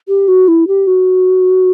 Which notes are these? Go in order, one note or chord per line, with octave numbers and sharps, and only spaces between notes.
G4
F#4
E4
G4
F#4